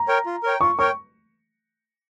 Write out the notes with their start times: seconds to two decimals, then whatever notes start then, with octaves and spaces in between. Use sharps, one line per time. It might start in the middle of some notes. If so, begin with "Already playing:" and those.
Already playing: A#5
0.08 A#4 C#5 G5
0.26 F4
0.43 A#4 C#5 G5
0.61 F4 C#6
0.79 A#4 C#5 G5 C#6